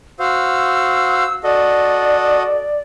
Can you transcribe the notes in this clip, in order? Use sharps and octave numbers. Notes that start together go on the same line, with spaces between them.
F#4 C5 F5 E6
F#4 A4 D5 D#5